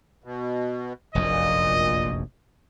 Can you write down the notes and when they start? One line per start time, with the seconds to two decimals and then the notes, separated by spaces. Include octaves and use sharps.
0.24 B2
1.15 F1 A#1 F#2 A#2 D#5